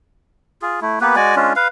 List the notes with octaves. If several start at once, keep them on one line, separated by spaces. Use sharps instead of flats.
F4 G#4
A3 E4
A#3 B3 G4 B4
G#3 F#4 D5 G#5
G#3 C#4 D4 F4
B4 F5